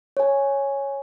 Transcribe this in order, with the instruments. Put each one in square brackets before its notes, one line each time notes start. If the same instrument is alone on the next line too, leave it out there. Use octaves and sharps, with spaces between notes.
[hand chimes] C#5 G#5